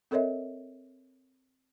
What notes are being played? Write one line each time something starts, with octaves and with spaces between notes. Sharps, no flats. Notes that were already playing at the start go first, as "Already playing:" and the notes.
C4 A4 A#4 C#5 D#5 E5